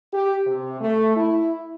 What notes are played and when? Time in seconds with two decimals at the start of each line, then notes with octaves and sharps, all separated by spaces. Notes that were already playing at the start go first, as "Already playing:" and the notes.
0.14 G4
0.47 C3
0.81 A3
1.17 E4